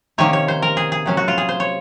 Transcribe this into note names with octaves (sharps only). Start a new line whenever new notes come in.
C3 D#3 A#3 C#4 C#5
C#5
C5
A#4
G#4
G#4
C3 F#3 C#4
F#4
F4
G#4
C5
C#5